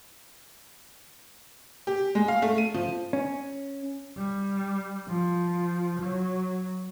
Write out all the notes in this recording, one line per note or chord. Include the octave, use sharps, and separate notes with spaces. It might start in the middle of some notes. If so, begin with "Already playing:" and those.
G4
G#3
F5
A3
D#7
F3
C#4
G3
F3
F#3